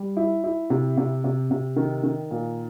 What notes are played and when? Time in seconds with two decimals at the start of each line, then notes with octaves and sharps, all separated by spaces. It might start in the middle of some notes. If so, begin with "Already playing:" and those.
Already playing: G3
0.17 E4
0.44 E4
0.70 C3
0.97 C3
1.24 C3
1.51 C3
1.76 D#3
2.03 D#3
2.31 A#2